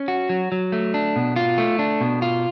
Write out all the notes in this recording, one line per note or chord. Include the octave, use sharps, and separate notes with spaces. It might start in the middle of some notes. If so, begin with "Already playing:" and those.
Already playing: C#4
F#4
F#3
F#3
A3
D4
B2
F4
A3
D4
B2
F4